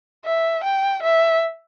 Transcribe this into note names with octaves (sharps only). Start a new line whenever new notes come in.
E5
G5
E5